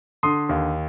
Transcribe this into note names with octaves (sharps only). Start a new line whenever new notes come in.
D3 C6 D#6
D#2